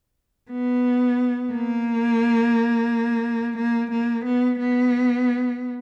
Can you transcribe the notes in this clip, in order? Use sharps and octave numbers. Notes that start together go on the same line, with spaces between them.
B3
A#3
A#3
A#3
B3
B3